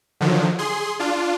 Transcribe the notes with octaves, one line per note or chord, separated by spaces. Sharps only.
D3 D#3 F3 F#3
G#4 C6
D4 F4